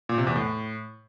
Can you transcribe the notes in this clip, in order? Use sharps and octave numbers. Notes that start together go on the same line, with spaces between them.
A#2
C3
E2
A2